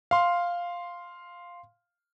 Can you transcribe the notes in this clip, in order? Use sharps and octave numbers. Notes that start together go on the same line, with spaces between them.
F5 C6